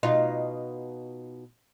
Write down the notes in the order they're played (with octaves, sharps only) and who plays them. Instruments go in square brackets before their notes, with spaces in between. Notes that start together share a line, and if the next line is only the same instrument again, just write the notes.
[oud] B2 D#4 F4